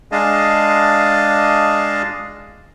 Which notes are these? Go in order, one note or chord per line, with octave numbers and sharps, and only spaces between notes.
G#3 D4 G#4 D#5 F5 A5